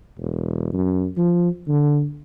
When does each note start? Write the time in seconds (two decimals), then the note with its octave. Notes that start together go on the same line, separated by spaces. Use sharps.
0.18 E1
0.73 F#2
1.18 F3
1.68 D3